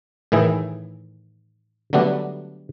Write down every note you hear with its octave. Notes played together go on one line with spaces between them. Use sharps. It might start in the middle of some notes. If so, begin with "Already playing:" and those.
A2 D#3 E3 E4 G#4
D3 F#3 G3 A3 B3 D4